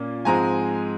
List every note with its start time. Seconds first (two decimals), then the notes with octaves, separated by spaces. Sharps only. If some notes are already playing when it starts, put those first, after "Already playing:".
Already playing: A#2 A#3 C#4
0.25 G#2 F3 G#3 C4 G#5 A#5